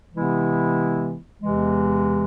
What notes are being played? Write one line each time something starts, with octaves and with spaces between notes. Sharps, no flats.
C3 E3 G#3 B3 E4
E2 C3 E3 G#3